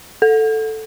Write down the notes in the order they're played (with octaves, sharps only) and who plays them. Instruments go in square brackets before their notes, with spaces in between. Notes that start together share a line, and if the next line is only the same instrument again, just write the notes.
[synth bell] A4